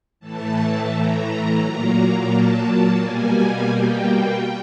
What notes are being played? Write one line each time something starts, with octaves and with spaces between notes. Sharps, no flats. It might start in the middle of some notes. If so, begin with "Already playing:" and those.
A2 E3 A3 A5
A#5
A#2 F#3 A#3
A5
B2 G3 A#3 G#5
G5